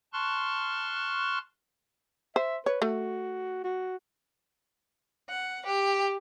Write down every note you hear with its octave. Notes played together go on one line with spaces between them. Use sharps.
A5 C6 C#6 F6 F#6
C5 E5
B4 C#5
A3 F#4
F#4
F#5
G4